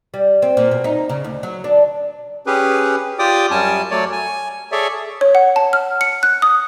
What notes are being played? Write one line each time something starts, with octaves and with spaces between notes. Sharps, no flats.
G3
C4
A#2
B2
D#4
C#3
D2
F#3
D4
C#4 G4 G#4 B4
F4 G4 D5 G5 D6 D#6
F#2 G3 C#4 G#5 A5
F#3 A3 C#5 D5
G#5
G#4 A4 C#5 D5 E5
C#5
F#5
A5
F6
C#7
F#6
D#6